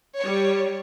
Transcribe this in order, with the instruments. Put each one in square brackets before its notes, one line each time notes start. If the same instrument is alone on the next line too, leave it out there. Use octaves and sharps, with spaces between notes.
[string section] G3 C#5